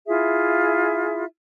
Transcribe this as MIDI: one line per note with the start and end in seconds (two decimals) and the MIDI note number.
0.07 1.24 64
0.07 1.24 65
0.07 1.24 68
0.07 1.24 76